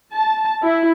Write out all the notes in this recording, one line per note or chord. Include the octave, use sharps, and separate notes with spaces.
A5
E4